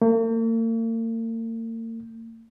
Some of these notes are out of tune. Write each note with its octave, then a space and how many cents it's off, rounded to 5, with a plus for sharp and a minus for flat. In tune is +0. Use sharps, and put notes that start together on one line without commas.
A#3 -45